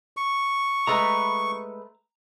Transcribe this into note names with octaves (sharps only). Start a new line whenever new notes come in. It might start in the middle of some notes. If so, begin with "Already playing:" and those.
C#6
G#3 A3 B4 A#5